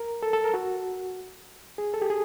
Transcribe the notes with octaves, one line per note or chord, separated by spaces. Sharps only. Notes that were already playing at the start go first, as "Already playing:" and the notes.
Already playing: A#4
A4
A4
A#4
F#4
G#4
A4
G4
G#4